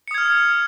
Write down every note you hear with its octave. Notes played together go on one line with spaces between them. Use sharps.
D#6 F6 G#6 C#7